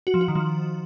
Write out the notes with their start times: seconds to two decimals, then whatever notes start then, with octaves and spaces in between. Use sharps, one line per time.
0.07 F#4
0.14 F3
0.21 F#4
0.28 D#3
0.35 F3